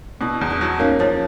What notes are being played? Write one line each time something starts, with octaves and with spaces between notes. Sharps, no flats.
B2 D4 E4
E2
D4 E4
F#3
A#3 C#4 D#4
F3 C#4 D#4